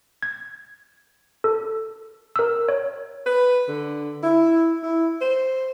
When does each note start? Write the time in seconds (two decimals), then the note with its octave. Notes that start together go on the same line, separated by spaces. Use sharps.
0.23 G#6
1.44 A4
2.36 A#4 E6
2.69 C#5
3.26 B4
3.68 D3
4.23 E4
4.83 E4
5.21 C5